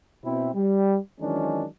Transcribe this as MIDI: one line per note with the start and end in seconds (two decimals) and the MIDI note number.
0.24 0.50 47
0.24 0.50 60
0.24 0.50 64
0.55 0.97 55
1.21 1.66 51
1.21 1.66 52
1.21 1.66 54
1.21 1.66 56
1.21 1.66 61
1.21 1.66 62